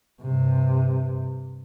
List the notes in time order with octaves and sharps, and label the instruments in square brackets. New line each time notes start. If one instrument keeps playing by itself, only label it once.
[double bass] G2 C3